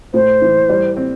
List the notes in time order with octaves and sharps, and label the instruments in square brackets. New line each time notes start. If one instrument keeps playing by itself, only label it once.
[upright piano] A2 [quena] C5
[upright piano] E3
G3
C4